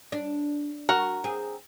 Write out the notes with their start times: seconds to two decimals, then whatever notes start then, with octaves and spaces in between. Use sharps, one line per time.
0.12 D4
0.89 F#4 A#4 F#5
1.24 C4 G#4